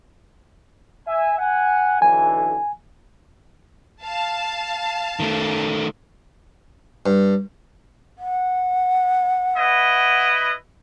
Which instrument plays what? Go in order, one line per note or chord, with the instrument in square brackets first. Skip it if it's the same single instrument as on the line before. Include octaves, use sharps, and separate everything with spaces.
[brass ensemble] E5 G#5
F#5 G#5
[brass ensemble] B1 D3 E3 [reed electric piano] G#5
[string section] F5 A5
[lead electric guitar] D#3 A3
[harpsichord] G2
[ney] F#5
[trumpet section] E4 B4 D#5